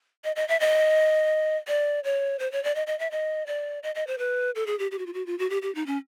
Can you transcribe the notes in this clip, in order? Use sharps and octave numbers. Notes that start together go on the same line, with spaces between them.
D#5
D#5
E5
D#5
D5
C#5
C5
C#5
D5
D#5
D#5
E5
D#5
D5
D#5
D#5
C5
B4
A4
G#4
G4
G4
F#4
F4
F#4
F4
F#4
G4
G4
D#4
C#4